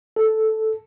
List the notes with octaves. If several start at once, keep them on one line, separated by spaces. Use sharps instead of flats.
A4